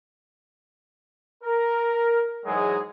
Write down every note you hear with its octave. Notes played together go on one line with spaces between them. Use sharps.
A#4
G#2 E3 F#3 G#3 G#4